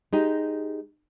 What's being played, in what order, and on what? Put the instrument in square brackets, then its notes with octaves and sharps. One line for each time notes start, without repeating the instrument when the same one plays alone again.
[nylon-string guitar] G#3 D#4 G4